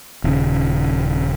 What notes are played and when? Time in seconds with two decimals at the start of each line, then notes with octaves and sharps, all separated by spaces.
0.24 D#1 C#3